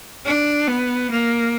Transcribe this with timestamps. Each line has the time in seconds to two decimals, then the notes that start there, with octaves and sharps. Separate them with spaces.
0.25 D4
0.67 B3
1.11 A#3